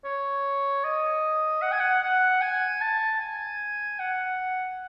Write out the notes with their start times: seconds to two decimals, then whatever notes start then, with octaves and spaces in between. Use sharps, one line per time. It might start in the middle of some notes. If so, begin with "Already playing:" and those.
0.04 C#5
0.84 D#5
1.62 F#5
1.72 G#5
1.79 F#5
2.02 F#5
2.42 G#5
2.81 A5
3.20 G#5
3.99 F#5